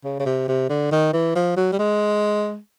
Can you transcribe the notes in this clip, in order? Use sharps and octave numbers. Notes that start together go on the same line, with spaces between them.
C#3
C#3
C3
C3
D3
D#3
E3
F3
F#3
G3
G#3